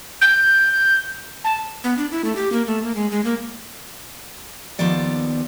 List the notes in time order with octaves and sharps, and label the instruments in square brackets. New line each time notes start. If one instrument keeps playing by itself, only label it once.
[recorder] G6
A5
B3
D4
E4
A3
G4
A#3
A3
A#3
G#3
G#3
A#3
[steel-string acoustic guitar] D#2 D#3 F3 B3 D5 F#5